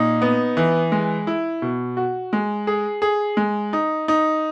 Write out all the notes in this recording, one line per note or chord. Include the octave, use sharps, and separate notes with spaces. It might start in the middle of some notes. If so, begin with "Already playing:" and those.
Already playing: A#2 D#4
B3
E3
G#3
E4
B2
F#4
G#3
G#4
G#4
G#3
D#4
D#4